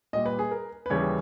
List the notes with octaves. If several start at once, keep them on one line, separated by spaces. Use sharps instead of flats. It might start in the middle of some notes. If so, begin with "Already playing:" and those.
A#2 G3 D#5
B4
G#4
A#4
B4
D#2 C#3 E3 G3 C#5